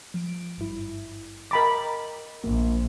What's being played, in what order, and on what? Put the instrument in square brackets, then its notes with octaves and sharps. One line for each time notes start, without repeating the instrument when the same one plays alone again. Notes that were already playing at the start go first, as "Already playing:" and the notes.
[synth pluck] F3 D7
G#1 G2 E4
[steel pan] A#4 B5 D6 [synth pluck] D#5 G5 A6
[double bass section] A#1 [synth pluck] A#3